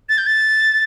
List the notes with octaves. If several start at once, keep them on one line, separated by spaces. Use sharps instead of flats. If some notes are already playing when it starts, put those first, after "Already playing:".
A6
G6
A6